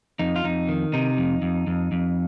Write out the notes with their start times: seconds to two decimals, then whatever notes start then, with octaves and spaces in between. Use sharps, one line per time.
0.19 F2 D#4
0.36 F4
0.44 F2 D#4
0.69 D#3
0.93 C3 D#4
1.18 F2
1.42 F2
1.67 F2
1.92 F2